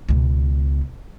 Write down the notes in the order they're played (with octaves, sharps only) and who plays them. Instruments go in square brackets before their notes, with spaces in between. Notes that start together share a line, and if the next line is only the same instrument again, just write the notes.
[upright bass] C#2 B2